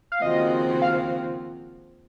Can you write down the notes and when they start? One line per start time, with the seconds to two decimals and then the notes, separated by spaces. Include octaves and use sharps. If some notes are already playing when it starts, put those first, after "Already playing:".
0.12 F5
0.21 D#2 C#3 F3 C4 F#4 D#5
0.82 F5